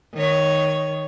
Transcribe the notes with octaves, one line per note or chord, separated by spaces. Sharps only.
D#3 C#5